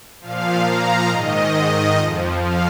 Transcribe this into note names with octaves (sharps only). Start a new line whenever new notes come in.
A#2 F3 F5
F5 A#5
G#2 D#3 D#5
F2 F3
F5